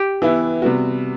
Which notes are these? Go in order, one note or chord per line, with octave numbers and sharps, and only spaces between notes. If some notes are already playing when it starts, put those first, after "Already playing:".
Already playing: G4
E3 B3 E4
C3 G3 B3 F#4